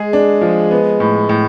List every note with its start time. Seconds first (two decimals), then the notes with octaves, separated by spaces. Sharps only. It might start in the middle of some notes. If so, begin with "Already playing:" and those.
Already playing: G#3 G#4
0.13 D4
0.41 F3
0.71 B3
1.00 A2
1.29 A2